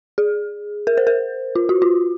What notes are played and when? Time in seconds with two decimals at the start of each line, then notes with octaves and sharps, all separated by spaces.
0.18 G#4
0.87 A#4
0.97 C5
1.07 A#4
1.56 F4
1.69 F#4
1.82 F4